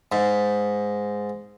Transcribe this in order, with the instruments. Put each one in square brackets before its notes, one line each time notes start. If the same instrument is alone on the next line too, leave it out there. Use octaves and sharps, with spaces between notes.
[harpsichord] G#2